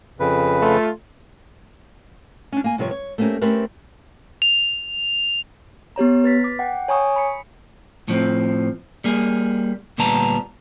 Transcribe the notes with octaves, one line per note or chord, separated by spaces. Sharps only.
F2 C#3 B4
A3 F4
C#4 D4
A#3 G#5
G2 C3 F3 B4 C#5
C#5
A3 A#3 C4 C#4 G4 A#4
A3 C4 C#4 G4 A#4 B4
F7
B3 G4 C#5 A#5
B4 A6 B6
D6
F#5 G5
C#5 G#5 A#5 C#6 D#6
B5 C#7
A2 F3 C4
G3 A#3 G#4
D2 A#2 G3 B3 A5 A#5